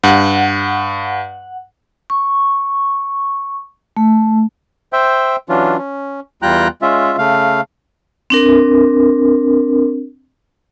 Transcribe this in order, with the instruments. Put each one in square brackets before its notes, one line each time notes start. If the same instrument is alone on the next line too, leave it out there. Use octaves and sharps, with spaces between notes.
[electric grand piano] G2 [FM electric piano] F#5
[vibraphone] C#6
A3
[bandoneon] C5 E5 G5
E3 F#3 C#4 D4 F4
C#4
E2 G3 F4 G5 A#5 F#6
G#3 C#4 F4 E5
C#3 A3 F5
[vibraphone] C4 D4 A#4